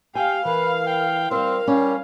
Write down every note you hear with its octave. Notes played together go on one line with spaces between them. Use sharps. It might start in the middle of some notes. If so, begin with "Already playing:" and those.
G4 F5 G5 G#5
E3 A#4 B4
G5
G3 C4 A#4 C5 F5
G3 C#4